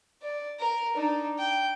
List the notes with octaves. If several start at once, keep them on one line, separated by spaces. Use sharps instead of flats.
D5
A#4
D4 D#4
G5